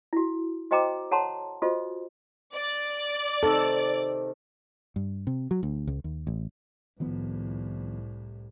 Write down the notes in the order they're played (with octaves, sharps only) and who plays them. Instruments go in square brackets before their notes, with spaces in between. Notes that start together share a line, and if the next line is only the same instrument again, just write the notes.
[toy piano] E4 F#4
F#4 C5 D#5 G5 A#5 D6
A4 C#5 F#5 A5 A#5 C6
F4 F#4 A4 C5 D#5
[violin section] D5
[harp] C3 D#3 D#4 [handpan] A4
[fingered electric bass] G2
C3
F#3
D2
C#2
D#2
A1
[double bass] C2 A2 [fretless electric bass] D#3 F3 B3